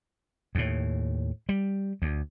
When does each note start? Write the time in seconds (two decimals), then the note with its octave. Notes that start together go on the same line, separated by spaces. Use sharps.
0.55 D#2 A2
1.49 G3
2.02 D2